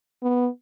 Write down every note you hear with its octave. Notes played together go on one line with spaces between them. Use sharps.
B3